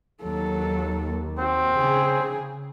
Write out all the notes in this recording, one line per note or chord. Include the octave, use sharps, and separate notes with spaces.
D#2 F#3 A4
C4 F#4
C#3 G#4